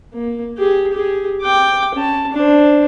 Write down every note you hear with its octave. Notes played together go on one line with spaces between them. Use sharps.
A#3
G4 G#4
G4 G#4
G5 D6
C#4 A5
D4 C5